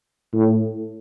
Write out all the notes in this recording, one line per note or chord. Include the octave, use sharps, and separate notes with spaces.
A2